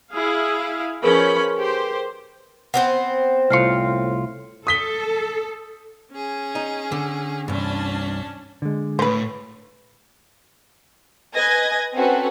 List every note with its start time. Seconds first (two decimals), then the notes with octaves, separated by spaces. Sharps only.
0.12 E4 G#4 F5
1.03 F3 C#4 G#4 A#4 B4 B5
1.57 G4 C5
2.74 B3 C4 C5 F#5
3.50 C2 A2 F4 F6 C7 C#7
4.67 A4 D#6 B6 G7
6.11 C#4 G#4
6.55 D#4
6.92 D3
7.48 C2 G2 C#4 D4 A5
8.62 D3 G#3
8.99 A2 B4 C5
11.34 B4 D#5 G#5 G#6 A#6
11.94 C4 C#4 F#4 A4 B4